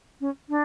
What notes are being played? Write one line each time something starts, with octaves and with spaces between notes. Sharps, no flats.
C#4
D4